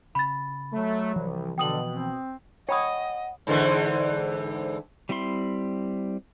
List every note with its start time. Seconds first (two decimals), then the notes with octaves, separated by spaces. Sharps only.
0.15 C#3 B5 A6
0.73 F#3 A3
1.16 C2 E3 F3
1.58 B2 D3 G5 D#6 F#7
1.89 C4
2.69 C#5 D#5 F#5 G5 B5 D#6
3.47 G#2 D3 E3
5.09 G3 C4 E4 B5 C6